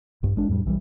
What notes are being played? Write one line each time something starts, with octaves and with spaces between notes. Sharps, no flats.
A#1 G2
G#1 G#3 D4
F2 A2 G3
B1 E3 F#3 G3